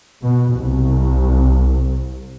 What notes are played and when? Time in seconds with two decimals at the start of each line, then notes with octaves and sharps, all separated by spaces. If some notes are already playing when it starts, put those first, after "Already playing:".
0.22 B2
0.53 C2